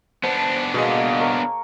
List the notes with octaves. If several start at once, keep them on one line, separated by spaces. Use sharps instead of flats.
B3 D4 C5 A5
B2 G#3 A#3 D5 D#5
A#4 C#5